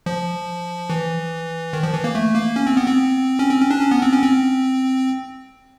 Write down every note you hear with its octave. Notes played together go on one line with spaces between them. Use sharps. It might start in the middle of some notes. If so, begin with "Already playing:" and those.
F3
E3
D#3
F3
E3
A#3
A3
A#3
C#4
C4
B3
C4
C#4
C4
C#4
D4
C#4
B3
C4
C#4
C4